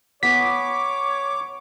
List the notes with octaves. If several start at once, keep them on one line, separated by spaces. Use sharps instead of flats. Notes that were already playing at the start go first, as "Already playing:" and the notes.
B3 B4 C#5 G#5 D6 B6